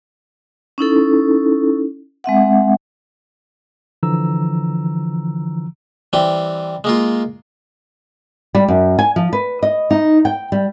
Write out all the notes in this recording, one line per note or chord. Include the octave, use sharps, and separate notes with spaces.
C#4 D#4 E4 A4
G#3 C4 E5 F#5
D3 E3 F3 A#5 E6
E3 G3 C4
G#3 A#3 F4
G3
F#2
G#5
F3
B4
D#5
D#4
G5
G3